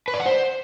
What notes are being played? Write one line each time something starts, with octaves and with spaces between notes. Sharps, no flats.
B4
D5
F#5
C5